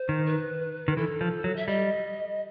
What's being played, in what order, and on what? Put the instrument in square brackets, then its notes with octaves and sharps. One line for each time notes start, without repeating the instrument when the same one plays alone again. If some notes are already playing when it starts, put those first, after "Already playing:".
Already playing: [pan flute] C5
[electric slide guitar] D#3
[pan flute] B4
[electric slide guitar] D#3
[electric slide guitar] E3 [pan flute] A4
[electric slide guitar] F3
F#3
[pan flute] E5
[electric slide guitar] G3 [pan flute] D#5